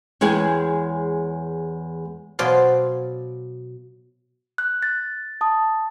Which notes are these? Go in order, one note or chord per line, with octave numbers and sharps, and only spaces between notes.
E2 G#3 G#4 C#5 G5
B2 F#3 C5 D5 F5 C6
F#6
A6
A5 D#6